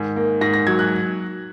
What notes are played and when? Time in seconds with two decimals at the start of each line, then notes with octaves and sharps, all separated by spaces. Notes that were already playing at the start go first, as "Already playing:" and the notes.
Already playing: G#2 D#3
0.16 A#3
0.41 G#2 A#6
0.54 A#6
0.67 F#3 G#6
0.79 F#6